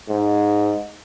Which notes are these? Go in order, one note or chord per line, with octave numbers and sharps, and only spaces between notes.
G#2